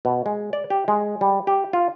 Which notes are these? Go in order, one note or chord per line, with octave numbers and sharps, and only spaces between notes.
B2
G#3
D5
G4
G#3
G3
G4
F4